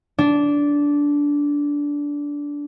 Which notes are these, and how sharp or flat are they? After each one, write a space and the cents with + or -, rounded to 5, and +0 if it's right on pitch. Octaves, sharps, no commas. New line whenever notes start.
D4 -15